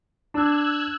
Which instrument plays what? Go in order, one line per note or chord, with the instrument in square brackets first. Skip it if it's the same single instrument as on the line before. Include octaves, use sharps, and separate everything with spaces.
[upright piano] D4 [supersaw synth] E6 F#6 G#6